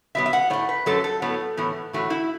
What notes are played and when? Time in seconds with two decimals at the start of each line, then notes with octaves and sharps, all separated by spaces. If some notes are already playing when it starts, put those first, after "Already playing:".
0.15 B2 F#3 B3 E5
0.26 E5
0.33 F#5
0.50 A2 C#5
0.53 A3
0.69 B4
0.86 F#2 F#3 A3 A4
1.04 A4
1.22 A2 F#3 B3
1.57 A2 E3 B3
1.93 A2 E3 A3 F#4
2.10 E4